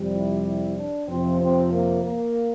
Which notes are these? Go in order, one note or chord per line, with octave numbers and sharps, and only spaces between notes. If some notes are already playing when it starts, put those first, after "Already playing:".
Already playing: F2 C3 G3
E4
E4
D4
F2 C3 F3 C4
C4
A#3
A#3